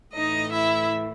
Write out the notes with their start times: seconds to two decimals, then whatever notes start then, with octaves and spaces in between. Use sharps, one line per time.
0.15 A2 E3 A3 D#4 D#5
0.51 E4 E5